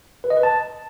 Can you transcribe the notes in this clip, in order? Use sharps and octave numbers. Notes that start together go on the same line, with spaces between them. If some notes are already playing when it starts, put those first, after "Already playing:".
B4
D#5
B4
A5